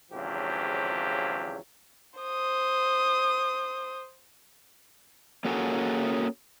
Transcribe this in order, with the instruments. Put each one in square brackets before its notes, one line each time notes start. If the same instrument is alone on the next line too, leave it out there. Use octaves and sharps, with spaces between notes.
[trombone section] G#1 E2 C#3 F3 F#3 G4
[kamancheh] C5 D#6
[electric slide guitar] A#3 C#4 F#4 G#4 A4 C#5